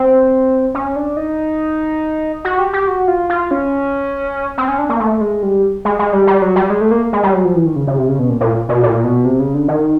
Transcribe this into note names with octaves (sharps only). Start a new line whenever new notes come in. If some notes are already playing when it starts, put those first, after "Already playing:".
Already playing: C4
C#4
D4
D#4
F#4
G4
G4
F#4
F4
F4
C#4
C4
C#4
D4
A#3
A3
G#3
G3
G#3
G#3
G3
G3
F#3
G3
G#3
A3
A#3
G#3
G3
F#3
F3
E3
D#3
C#3
C#3
C3
C#3
B2
A#2
A#2
B2
A#2
B2
C3
C#3
D3
D#3